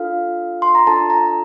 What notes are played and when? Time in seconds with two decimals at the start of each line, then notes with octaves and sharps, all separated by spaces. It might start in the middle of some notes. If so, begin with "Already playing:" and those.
Already playing: D4 F4 A4 F5
0.62 C6
0.75 A#5
0.87 D4 F4 A4 A5
1.10 A#5